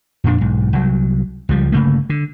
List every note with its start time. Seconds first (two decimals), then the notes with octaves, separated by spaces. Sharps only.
0.24 F2 A#2 D4
0.41 B1 G#2
0.73 C2 F#3
1.49 C#2 F3 G3
1.72 G1 C#3 A3 A#3
2.10 D3